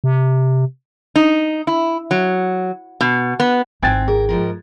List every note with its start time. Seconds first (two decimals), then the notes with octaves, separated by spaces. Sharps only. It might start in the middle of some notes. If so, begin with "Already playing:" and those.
0.04 C3
1.16 D#4
1.67 E4
2.11 F#3
3.01 B2
3.40 B3
3.83 G#1 C4 E4 G5 G#5 F#6 G#6 A6
4.08 G#4 A#4
4.29 G#2 F3 A#4